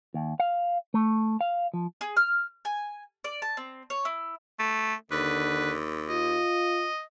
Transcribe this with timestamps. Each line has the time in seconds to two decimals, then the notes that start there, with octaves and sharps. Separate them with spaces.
0.14 D#2
0.40 F5
0.94 A3
1.41 F5
1.74 F3
2.01 G#4
2.17 F6
2.65 G#5
3.24 D5
3.42 A5
3.57 C4
3.90 C#5
4.05 E4
4.59 A3
5.11 D#2 D3 B4
6.09 F4 D#5